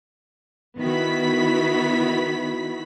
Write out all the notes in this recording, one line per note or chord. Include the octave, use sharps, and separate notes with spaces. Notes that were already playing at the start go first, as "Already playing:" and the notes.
D#3 B3 E4 F#4 B5 B6